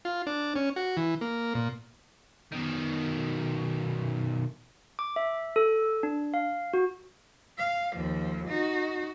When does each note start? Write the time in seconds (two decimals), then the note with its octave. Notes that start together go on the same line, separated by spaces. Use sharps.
0.05 F4
0.27 D4
0.56 C#4
0.76 F#4
0.97 E3
1.21 A#3
1.55 A#2
2.52 B2 D#3
4.99 D6
5.16 E5
5.56 A4
6.03 D4
6.34 F5
6.74 F#4
7.59 F5
7.96 D#2 F3
8.48 D#4 F#4